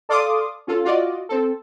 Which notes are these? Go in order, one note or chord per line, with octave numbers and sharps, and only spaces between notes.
A4 D5 F5 C6 D6 D#6
C#4 F4 A4
F4 F#4 D5 D#5
C4 A4